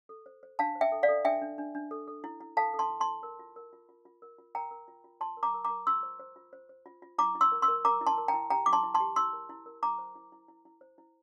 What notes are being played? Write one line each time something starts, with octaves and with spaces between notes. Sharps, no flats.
A4
C5
C5
D4 F5 A5
C5
E5 G5
A4
D5 F5
A4
D4 E5 G5
D4
D4
D4
A4
A4
E4
E4
A4 F5 A5
A4
A5 C6
E4
A5 C6
E4
A#4
F4
A#4
F4
F4
F4
A#4
F4
A#4 G5 A#5
A#4
F4
F4
F4 A5 C6
A#4
A#5 D6
A#4
A#5 D6
A#4
F4 C6 E6
C5
C5
F4
C5
C5
F4
F4
E4 A#5 D6
E4
C6 E6
A#4
C6 E6
A#4
A#4 A#5 D6
E4
A5 C6
A#4
G5 A#5
E4
G4 G5 A#5
E4 D6
A5 C6
E4
A5 C6
G4
E4 C6 E6
A#4
E4
A#4
E4 A#5 D6
C5
E4
E4
E4
E4
C5
E4